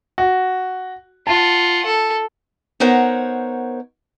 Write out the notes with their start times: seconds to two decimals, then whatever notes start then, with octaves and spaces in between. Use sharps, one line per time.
0.18 F#4
1.27 F4 F#5 A5
1.85 A4
2.80 B3 D#4 A#4 C5 C#5 F#5